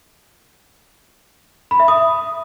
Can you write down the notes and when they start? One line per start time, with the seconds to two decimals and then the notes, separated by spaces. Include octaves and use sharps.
1.71 B5
1.80 E5
1.88 D#6